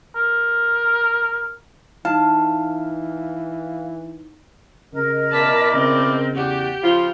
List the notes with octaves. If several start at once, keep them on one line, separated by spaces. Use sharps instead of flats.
A#4
E3 D#4 F5 A5
C#3 A#4 D#5
B2 E4 D5 A5 B6
C#3 C4
E2 F#4 G4 D5
C#3 F3 F4